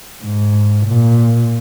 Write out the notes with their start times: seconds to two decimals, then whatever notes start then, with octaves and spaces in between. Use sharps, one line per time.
0.24 G#2
0.86 A#2